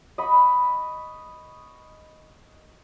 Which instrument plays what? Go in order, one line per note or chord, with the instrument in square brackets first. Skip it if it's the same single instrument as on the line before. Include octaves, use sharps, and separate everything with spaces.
[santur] D#5 B5 C#6